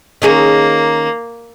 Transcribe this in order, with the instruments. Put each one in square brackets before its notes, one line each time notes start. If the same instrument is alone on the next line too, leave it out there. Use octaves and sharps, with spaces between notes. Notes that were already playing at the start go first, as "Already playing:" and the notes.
[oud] D#3 C#4 G#4 [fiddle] A#3